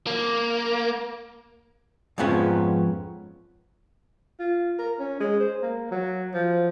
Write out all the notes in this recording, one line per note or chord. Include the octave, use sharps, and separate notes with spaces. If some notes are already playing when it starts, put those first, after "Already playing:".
A#3
F2 G#2 F3 B3 C#4
F4
A#4
C#4
G#3
C5
A#3
F#3
F3